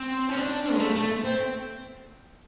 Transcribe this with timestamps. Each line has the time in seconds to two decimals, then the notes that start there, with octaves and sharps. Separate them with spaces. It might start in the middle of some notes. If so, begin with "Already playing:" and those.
Already playing: C4
0.29 C#4
0.37 D4
0.72 G#3
0.80 A3
0.95 A3
1.24 C4